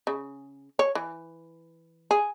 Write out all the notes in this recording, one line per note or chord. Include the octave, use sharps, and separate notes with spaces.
C#3
C#5
E3
G#4